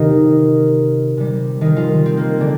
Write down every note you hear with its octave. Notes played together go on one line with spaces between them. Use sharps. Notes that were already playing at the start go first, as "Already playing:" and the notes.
Already playing: C3 D#3 D#4 F4
C3 G3
D#3 D#4
F3 F4
C4
A#3
D3 D4